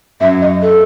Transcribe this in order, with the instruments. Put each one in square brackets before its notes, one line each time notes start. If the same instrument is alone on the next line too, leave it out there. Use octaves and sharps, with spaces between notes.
[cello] F#2 [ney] E5
[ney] D#5
A4